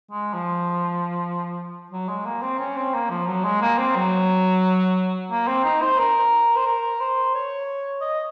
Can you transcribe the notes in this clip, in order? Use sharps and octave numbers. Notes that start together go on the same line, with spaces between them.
G#3
F3
F#3
G#3
A#3
C4
C#4
C4
A#3
F3
F#3
G#3
A#3
C4
F#3
A#3
C4
D#4
C5
A#4
C5
A#4
C5
C#5
D#5